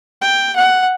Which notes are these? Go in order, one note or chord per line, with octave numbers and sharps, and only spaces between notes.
G5
F#5